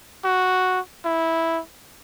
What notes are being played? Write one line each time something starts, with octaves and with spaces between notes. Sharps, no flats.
F#4
E4